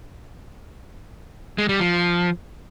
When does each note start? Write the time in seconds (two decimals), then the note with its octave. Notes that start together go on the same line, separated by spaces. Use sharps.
1.58 G#3
1.69 G3
1.80 F3